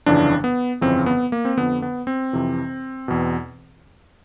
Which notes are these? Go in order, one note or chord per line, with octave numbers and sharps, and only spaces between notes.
G1 F2 C#3 E3 D4
B3
G1 F2 C#3 E3 C4
B3
A#3
C4
F2 D3 B3
B3
C4
F2 C3 E3
E2 B2